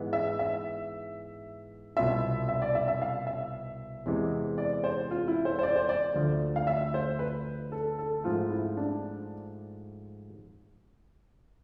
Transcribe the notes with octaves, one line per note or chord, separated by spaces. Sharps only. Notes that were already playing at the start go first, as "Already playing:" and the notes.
Already playing: G#2 E3 G#3 B3
E5
E5
C2 B2 B3 F4 E5
E5
D5
E5
E5
F5
E5
E2 C3 E3 G#3 C4
D5
C5
F4
E4
C5
C5
D5
C5
D5
D2 D3 F3 A3
F5
E5
C5
B4
A4
A4
G#2 F3 A3 F4
E4
D4